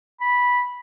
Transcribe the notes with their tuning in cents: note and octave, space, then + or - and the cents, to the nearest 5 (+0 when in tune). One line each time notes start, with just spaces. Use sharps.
B5 -10